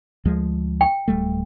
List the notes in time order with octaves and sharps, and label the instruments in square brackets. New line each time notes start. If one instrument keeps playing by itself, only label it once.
[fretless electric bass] D2 F3 G#3
[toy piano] G5
[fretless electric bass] D1 G3 A3